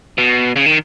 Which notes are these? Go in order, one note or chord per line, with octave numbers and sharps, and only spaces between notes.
B2
C#3
D#3